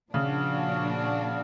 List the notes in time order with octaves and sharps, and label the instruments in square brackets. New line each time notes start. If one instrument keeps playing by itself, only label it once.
[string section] A#2 F3 A#3 D4 F#4 [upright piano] C#3